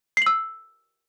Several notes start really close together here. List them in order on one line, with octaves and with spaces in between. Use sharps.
C7 F#7 E6